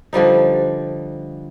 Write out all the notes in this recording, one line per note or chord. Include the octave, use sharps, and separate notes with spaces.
D3 F3 G3 D#4